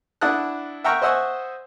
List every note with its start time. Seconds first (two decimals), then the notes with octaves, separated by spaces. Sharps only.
0.21 D4 E4 F#5 A5 D#6 F#6
0.84 E5 F#5 G5 A#5 C#6 F6
1.02 C5 D#5 E5 F#5 G#5 C#6